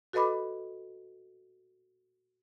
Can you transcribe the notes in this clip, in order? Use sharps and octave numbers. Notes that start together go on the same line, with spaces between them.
F#4 A4 B4 D#5 B5 D6